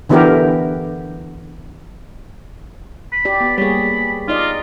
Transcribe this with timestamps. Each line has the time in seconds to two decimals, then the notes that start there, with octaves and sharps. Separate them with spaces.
0.09 D3 E3 B3 E4 G4 A#4
3.13 B5
3.25 G4 D5
3.40 B3
3.58 G3 A#3 G#4 C#5 B5
4.28 D#4 F4 D5 D#5